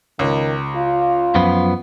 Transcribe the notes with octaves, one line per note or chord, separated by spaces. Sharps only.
C#2 D#3
F4
F#2 F3 B3